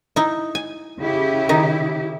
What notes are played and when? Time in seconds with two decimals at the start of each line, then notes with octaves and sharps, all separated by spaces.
0.16 D#4 E4
0.55 G#5
0.99 C#3 E4 G4
1.49 D#3 D#4